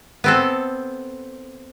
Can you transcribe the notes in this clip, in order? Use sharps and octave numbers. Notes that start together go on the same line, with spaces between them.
B3 C4 A4